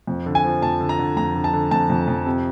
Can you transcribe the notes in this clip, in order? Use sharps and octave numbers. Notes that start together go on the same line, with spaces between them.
F2
D3
G#5
F3
F2 A5
D3
A#5
D3
F2 A#5
D3
A5
D3
F2 A5
F2
F2
C3